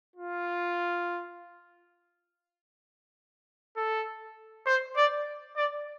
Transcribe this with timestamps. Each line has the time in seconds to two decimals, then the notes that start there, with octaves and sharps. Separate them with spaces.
0.16 F4
3.77 A4
4.67 C5
4.97 D5
5.57 D5